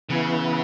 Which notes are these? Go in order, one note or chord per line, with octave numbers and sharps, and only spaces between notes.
C#3 E3 B3 E4